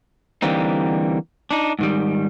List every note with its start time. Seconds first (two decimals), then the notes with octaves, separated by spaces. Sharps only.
0.42 D3 E3 G3 A#3 C4 D#4
1.51 D4 D#4
1.79 G#2 D#3 G3